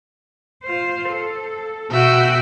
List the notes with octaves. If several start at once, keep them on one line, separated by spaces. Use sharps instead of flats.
F4 C5
A4
B2 F#4 E5 G5